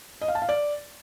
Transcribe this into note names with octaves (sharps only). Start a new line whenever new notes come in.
D#5
F5
A5
F5
D5